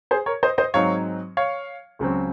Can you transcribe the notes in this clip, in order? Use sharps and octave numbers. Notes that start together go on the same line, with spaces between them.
G#4 C5
A#4 C#5
C5 D#5
C5 D#5
G#2 F#3 C4 D#4 C#5 F5
C#5 F5
C#2 C#3 F#3 C4